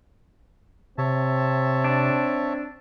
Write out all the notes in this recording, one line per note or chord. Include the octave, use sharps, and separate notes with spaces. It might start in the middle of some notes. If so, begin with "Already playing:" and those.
C3 C4 C#5 E5 A5
D4